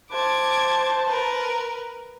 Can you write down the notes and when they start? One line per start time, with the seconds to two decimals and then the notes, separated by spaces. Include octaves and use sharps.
0.11 C5 A5 D6 G#6
1.06 A#4 B4